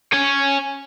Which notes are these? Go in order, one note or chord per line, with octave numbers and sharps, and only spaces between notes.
C#5 G#5